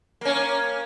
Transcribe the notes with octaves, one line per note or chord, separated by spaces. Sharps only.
A#3 C#4